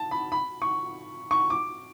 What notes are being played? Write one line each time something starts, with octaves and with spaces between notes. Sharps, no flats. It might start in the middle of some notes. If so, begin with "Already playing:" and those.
Already playing: A5
B5
B5
C#6
C#6
D6